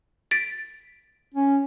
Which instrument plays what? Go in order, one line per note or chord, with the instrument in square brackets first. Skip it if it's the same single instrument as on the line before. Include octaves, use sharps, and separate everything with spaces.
[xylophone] A6 B6 D7
[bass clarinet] C#4